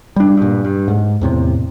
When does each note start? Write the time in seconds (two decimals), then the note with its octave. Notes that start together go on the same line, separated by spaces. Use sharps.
0.16 G3 D4
0.37 G2 A#2
0.64 G2
0.88 G#2
1.21 E2 A2 C3